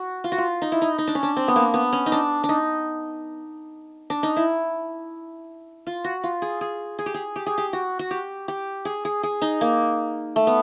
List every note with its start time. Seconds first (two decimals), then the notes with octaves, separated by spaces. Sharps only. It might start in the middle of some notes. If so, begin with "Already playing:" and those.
Already playing: F#4
0.24 F4
0.32 F#4
0.38 F4
0.62 D#4
0.72 E4
0.82 D#4
0.98 D#4
1.07 D4
1.15 C#4
1.23 D4
1.36 C4
1.48 B3
1.56 A#3
1.74 B3
1.93 C#4
2.06 D#4
2.12 D4
2.44 D4
2.49 D#4
4.10 D4
4.23 D#4
4.36 E4
5.87 F4
6.04 F#4
6.24 F4
6.42 G#4
6.61 G#4
6.99 G#4
7.06 G4
7.14 G#4
7.36 G4
7.46 G#4
7.58 G4
7.73 F#4
7.99 F#4
8.11 G4
8.48 G4
8.85 G#4
9.05 G#4
9.23 G#4
9.42 D#4
9.61 A#3
10.36 A3
10.47 B3